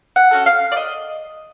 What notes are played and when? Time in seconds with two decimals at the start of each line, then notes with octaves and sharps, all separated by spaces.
0.16 F#5
0.31 C#4 F#4 A4
0.46 F5
0.72 D5
0.76 A3 D#5